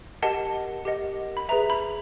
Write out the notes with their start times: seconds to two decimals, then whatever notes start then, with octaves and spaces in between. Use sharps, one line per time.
0.22 G4 A#4 D#5 F#5 A5
0.85 G4 A#4 D#5 F#5
1.37 B5
1.49 G#4 B4 E5 A#5
1.70 B5